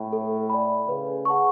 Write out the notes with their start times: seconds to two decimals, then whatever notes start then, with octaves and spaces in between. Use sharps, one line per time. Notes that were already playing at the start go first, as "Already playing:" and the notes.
Already playing: A2
0.13 A4
0.50 D5 G#5 B5
0.88 C#3 B4
1.25 F#5 A5 C#6